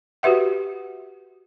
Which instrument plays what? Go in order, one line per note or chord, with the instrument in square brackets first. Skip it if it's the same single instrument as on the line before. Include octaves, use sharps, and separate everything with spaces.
[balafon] F#4 G4 B4 E5 F#5